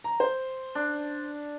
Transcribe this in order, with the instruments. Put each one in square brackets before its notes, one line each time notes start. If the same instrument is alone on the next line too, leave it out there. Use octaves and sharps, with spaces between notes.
[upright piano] A#5
C5
[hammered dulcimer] D4